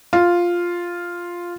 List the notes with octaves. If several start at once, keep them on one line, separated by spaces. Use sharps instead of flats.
F4